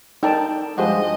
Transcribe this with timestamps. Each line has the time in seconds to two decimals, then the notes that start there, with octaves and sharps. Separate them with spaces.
0.23 D#4 A4 A#4 D5 G5 A5
0.78 G2 F3 G#3 F#4 G4 C5 D#5